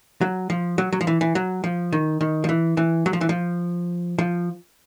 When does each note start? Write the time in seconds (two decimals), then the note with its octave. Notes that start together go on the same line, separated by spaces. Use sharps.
0.21 F#3
0.50 F3
0.78 F#3
0.92 F#3
1.01 F3
1.07 E3
1.21 E3
1.35 F#3
1.64 F3
1.92 D#3
2.21 D#3
2.44 F3
2.49 E3
2.77 E3
3.06 F#3
3.13 F3
3.21 E3
3.29 F3
4.18 F3